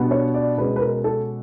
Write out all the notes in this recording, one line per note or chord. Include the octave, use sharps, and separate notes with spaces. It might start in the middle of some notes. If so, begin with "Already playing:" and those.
Already playing: B2 G3 B3 D4
C#5
D5
B2 G#3 C#4 B4
B4
A#4
A4